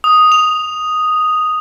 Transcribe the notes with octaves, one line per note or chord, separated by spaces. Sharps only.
D#6
F7